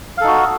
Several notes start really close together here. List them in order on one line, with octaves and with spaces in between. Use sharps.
F5 A4 D#4 F#4